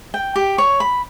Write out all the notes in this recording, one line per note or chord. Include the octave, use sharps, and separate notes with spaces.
G5
G4
C#5
B5